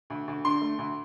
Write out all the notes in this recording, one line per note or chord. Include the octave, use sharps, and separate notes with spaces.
D2
D2
D3 C6
A3
D2